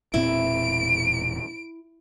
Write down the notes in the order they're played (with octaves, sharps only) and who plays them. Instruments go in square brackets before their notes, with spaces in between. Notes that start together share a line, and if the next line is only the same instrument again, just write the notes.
[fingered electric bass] E1 A#2 C4 [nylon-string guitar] E4 [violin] D7